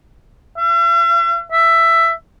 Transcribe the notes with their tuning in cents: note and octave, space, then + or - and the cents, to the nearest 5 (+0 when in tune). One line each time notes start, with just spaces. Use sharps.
E5 +45
E5 +10